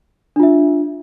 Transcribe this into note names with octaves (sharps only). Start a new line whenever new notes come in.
D4 F4 E5